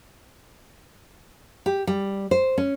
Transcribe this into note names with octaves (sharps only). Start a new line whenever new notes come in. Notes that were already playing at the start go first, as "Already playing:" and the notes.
G4
G3
C5
C#4